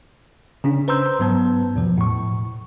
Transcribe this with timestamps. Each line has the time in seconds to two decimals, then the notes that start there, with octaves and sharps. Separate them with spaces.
0.64 C#3 C#4 D4
0.88 B4 C5 A#5 C6 E6 G6
1.19 G#2 F#3 B3 B4 A5
1.76 E2 B2 F3
1.98 A2 C#6